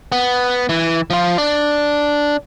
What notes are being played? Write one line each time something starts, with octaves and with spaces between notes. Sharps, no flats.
B3
E3
F3 F4
D4